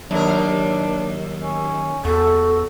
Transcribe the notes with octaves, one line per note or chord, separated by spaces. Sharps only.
D#2 F#3 D4 A#4
C#4
E2 F#4 A4